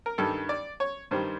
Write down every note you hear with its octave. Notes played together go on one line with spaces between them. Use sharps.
A#4
G2 D#3 G3 A4
D5
C#5
G2 D#3 G3 C5